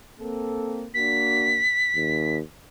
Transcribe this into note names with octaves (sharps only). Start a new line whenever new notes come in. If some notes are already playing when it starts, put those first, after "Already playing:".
A#3 C4 A4
A#3 D4 F#4 B6
D#2